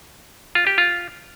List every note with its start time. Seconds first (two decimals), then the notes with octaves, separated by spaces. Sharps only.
0.55 F4
0.67 G4
0.78 F4